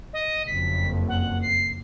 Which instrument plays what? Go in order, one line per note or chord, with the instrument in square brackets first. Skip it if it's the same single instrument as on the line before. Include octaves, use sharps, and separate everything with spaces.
[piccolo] D#5
[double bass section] F#1 F2 [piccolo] B6
[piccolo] F#5
C7